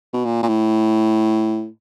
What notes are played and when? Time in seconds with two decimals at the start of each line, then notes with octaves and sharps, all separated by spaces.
0.13 B2
0.25 A#2
0.43 A#2
0.48 A2